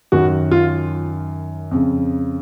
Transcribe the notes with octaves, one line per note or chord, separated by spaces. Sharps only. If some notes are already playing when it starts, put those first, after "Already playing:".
F#2 D#3 F#4
F4
F2 C#3